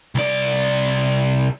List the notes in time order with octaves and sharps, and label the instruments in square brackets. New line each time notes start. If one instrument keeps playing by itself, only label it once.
[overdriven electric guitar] C2 D5